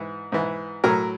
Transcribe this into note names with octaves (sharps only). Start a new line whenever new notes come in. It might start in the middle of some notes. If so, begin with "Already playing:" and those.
Already playing: G#2 E3
G#2 E3
A2 F#3 A#4